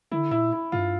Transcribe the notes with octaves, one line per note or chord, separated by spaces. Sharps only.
D3 E4
A#2 E4
E4
G2 F4